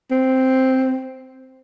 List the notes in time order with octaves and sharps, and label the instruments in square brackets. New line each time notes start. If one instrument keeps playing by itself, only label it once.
[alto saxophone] C4